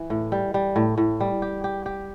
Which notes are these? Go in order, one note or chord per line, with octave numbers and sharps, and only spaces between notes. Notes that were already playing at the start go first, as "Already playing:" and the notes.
Already playing: E3
A2
G3
G3
A2
A2
G3
G4
G4
G4